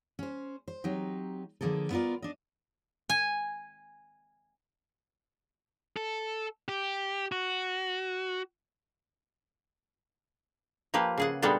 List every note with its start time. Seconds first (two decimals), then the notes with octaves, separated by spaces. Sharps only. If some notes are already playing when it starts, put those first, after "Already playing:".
0.19 C#4 C5
0.68 C5
0.84 F#3 C4 D#4 G4
1.61 D3 F3 A#3 G#4 A4
1.90 B3 E4 F4 A#4 D5
2.22 D4 D#5
3.09 G#5
5.97 A4
6.68 G4
7.32 F#4
10.94 F3 A#3 G4 B4
11.18 C#3 G#4 F#5
11.42 A#2 G3 G#3 B3 D4 A4